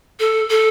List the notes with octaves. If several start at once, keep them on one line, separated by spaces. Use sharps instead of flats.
A4
A4